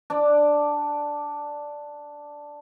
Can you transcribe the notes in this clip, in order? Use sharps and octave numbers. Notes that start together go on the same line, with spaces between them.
D4 D5